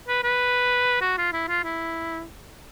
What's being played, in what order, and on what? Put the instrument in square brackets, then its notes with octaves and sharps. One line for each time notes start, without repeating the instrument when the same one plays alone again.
[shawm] B4
B4
F#4
F4
E4
F4
E4